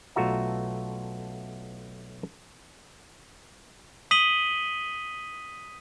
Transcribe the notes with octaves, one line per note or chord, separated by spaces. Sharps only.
B1 A3 F4 F#4 E5 A#5
D#6 B6 D#7 F#7 G7